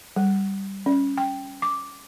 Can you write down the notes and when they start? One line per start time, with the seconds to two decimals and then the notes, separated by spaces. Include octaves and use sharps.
0.16 G3
0.86 C#4
1.18 G5
1.62 D6